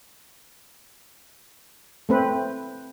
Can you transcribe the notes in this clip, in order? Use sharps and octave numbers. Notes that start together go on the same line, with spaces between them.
A3 C4 B4